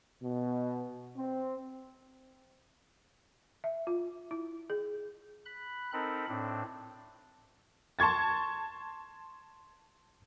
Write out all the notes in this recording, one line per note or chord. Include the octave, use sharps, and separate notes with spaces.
B2
C4
E5
F4
E4
G#4
B5 F#6
C4 D#4 A4 A#4 B5
A2 C4 D4
A5 C6 C#6 G#6 A6